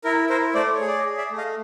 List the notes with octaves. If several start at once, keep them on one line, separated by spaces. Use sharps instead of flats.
E4 A#4
E4 A#4 C5
A3 C5 D5
C#5
G#4
D5
C#5 D#5
G#4
D5 E5
A3
D#5 F5